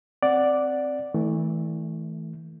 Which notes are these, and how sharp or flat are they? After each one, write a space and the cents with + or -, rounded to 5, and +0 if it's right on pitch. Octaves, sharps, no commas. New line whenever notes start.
C4 +0 D5 +0 F#5 +0
E3 -25 A3 +0